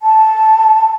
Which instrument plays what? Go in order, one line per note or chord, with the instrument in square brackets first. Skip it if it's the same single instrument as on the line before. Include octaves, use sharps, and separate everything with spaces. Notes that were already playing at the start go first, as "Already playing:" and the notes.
[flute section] A5